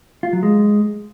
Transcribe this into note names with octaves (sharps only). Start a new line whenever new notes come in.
F4
F#3
G#3